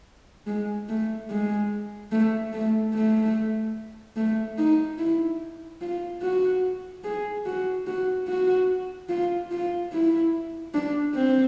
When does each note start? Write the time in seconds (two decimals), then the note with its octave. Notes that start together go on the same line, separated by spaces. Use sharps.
0.47 G#3
0.89 A3
1.30 G#3
2.12 A3
2.53 A3
2.94 A3
4.16 A3
4.58 D#4
4.98 E4
5.81 F4
6.22 F#4
7.04 G#4
7.46 F#4
7.87 F#4
8.28 F#4
9.09 F4
9.51 F4
9.92 E4
10.74 D4
11.15 C4